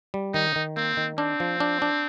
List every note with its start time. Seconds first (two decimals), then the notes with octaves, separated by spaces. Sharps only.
0.14 G3
0.34 D#3 D#4
0.56 D#3
0.77 A#3 C4
0.97 D#3
1.18 C4 D4
1.40 F3
1.60 D4
1.82 D4